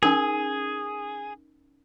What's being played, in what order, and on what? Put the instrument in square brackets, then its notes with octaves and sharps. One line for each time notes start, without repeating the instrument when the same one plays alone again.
[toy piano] C#4 D#4 A#4 [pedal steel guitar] G#4